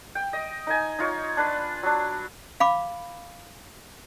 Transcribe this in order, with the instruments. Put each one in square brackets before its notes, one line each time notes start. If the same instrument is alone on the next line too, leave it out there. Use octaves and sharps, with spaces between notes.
[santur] G5
D#5
D#4 D#5 G#5
D#4 F4 C#5
D4 B4
F#3 D4
[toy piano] F5 B5 D6